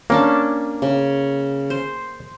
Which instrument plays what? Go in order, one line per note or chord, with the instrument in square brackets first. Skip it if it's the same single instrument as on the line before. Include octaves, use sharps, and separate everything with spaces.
[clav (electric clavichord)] A#3 [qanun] C#4 D4 A5
[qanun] C#3
C5